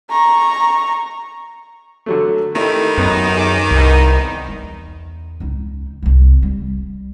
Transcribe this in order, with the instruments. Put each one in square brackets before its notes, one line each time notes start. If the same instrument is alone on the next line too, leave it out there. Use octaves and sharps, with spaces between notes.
[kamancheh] A#5 C#6
[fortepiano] D3 F#3 A3
[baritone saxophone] D#3 [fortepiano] A3 D#4 [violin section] E4 G4
[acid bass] F#2 [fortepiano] B3 [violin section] D#4
[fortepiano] G#4 [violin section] D6
[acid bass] C2 [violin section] B3 D#4 A#4
[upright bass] E2
C#2 D#4
C2 C3
G3